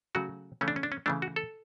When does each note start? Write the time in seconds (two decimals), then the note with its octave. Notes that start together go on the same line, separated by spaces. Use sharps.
0.15 C#3 F#3 A3 F#4
0.61 C#3 E3 A3 C#4
0.68 D4
0.76 C#4
0.83 D4
0.92 C#4
1.06 C#3 E3 A3 D4
1.22 F#4
1.36 A4